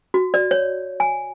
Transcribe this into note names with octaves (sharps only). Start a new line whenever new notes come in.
F#4
D5
C#5
G#5